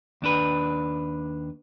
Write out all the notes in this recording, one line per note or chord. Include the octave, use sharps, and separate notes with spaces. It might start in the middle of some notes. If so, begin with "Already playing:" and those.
D#2 D4 B4